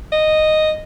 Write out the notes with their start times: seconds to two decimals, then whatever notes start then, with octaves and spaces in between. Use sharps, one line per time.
0.12 D#5